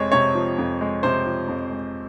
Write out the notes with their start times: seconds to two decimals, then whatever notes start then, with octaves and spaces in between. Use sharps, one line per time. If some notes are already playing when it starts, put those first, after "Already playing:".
Already playing: F2 C3 F3 G#3 C#5
0.12 C3 C#5
0.35 F3
0.58 F2
0.81 G#3
1.03 C3 C5
1.26 F3
1.48 F2
1.71 G#3